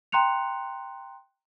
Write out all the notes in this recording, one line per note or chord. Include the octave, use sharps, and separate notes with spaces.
G5 A#5 C6 F#6 C#7 F7